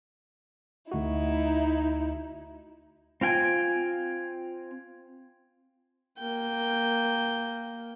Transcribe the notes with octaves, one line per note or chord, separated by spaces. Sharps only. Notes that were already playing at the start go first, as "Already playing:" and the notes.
D2 D#4 E4 F#4
C4 F4 G5 G#5
A#3 G5